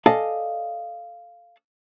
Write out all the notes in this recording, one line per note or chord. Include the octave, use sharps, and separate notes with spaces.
A4 D5 D#5 F5 G#5 A5